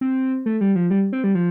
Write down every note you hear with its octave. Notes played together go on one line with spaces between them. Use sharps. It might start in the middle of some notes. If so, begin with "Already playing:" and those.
C4
A3
G3
F3
G3
C4
G3
F3